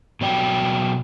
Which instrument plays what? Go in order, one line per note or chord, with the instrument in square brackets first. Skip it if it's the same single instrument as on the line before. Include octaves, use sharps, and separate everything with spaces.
[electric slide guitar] B2 F#3 D5 G5